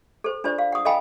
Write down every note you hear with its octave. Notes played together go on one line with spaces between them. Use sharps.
A4 C5
D4 F4 C5 D5
F5
F#5 D#6
A4 D#5 F5 G5 G#5 B5